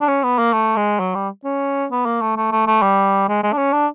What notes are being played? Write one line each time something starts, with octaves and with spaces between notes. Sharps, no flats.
D4
C#4
B3
A#3
A3
G#3
F#3
G3
C#4
B3
A#3
A3
A3
A3
A3
G3
G#3
G#3
D4
C#4
D4